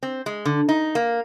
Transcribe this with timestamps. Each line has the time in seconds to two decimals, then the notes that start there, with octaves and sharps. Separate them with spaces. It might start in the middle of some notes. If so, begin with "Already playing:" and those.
0.03 C4
0.26 G#3
0.45 D3
0.69 D#4
0.95 A#3